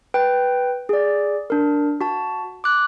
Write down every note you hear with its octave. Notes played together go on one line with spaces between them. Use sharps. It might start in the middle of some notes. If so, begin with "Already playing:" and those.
B4 G5
G#4 D5
D4 A#4
F#4 A5
D6 F#6